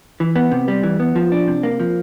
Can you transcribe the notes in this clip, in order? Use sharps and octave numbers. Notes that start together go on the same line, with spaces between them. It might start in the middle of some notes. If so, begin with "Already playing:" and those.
E3
B3
C3
G3
E3
B3
F3
D4
C3
A#3
F3